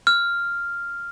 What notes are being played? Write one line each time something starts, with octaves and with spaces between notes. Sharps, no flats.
F6